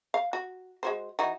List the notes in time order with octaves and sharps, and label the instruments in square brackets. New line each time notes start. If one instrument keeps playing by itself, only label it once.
[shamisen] F5
F#4
G#3 F#4 C5
E3 D#4 F#4